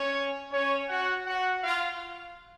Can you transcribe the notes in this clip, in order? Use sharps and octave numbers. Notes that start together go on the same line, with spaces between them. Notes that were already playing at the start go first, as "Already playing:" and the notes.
Already playing: C#4 C#5
C#4 C#5
F#4 F#5
F#4 F#5
F4 F5